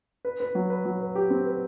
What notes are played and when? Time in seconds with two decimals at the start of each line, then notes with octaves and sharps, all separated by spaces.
0.25 B4
0.40 B4
0.55 F#3
0.70 B4
0.85 F#3
1.00 B4
1.15 G4
1.30 C4
1.46 B4